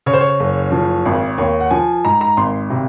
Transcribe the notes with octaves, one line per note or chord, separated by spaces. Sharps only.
C#3 C#5
C5
C#5
F#1
F3
G#1
D#2 C#5
F#5
F3 G#5
G#2 A#5
A#5
G#1 C6
C3